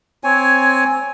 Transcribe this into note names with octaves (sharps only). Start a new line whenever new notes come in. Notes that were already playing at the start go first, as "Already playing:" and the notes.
C4 C#5 G#5